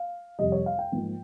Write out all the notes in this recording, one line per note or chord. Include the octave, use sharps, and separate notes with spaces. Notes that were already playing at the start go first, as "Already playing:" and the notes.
Already playing: F5
F2 C3 G3 D#5
C#5
F5
G5
G#2 F3 A#3